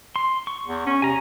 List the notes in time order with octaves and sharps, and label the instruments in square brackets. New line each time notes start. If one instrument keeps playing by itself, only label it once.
[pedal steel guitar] C6
C#6
[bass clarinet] E2
C#4
[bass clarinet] C3 [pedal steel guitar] G#5 A#5